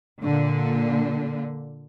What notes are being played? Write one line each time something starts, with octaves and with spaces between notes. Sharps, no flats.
A#2 D3